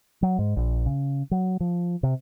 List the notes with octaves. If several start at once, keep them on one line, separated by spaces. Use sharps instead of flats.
F#3
G#2
A#1
C#3
F#3
F3
C3